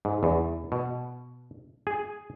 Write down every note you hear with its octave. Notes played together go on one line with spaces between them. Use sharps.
G#2
E2
B2
G#4